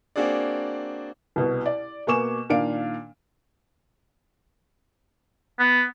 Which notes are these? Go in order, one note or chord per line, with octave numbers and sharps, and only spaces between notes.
A#3 C4 D4 F#4 G#4 D5
C2 B2
D5
B2 A#3 G#5 C#6 D6 E7
A#2 D#3 D4 F5 D7
B3